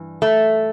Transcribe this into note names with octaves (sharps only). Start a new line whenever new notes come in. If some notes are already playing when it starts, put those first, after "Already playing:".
Already playing: G2 E3
A3